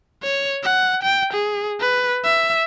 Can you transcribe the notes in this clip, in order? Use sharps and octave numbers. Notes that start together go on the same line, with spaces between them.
C#5
F#5
G5
G#4
B4
E5